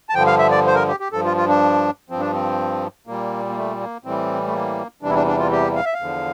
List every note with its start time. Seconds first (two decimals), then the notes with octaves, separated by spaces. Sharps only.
0.09 A5
0.14 G2 D3 F3 G5
0.27 F5
0.39 E5
0.51 D5
0.67 C5
0.75 A#4
0.88 G4
1.00 G4
1.12 G2 F3 A4
1.25 F4
1.37 F4
1.48 D4
2.10 G2 F3 C4
2.20 D4
2.32 C4
3.07 A#2 G3 A#3
3.50 A#3
3.56 A3
3.80 A#3
4.04 A2 E3 G3 C4
4.46 A3
4.53 A#3
5.02 E2 C3 E3 G3 D4
5.10 E4
5.15 D4
5.27 D4
5.39 F4
5.51 G4
5.76 F5
5.85 E5
5.94 F5
6.00 E2 D3 F3